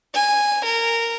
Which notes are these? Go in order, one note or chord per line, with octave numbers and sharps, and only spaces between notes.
G#5
A#4